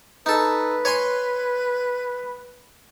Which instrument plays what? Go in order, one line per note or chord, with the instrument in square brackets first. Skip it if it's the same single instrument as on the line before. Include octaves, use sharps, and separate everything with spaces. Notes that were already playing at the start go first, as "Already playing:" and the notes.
[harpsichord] D#4 A4 [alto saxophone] B4
[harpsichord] C#5 G#5 C6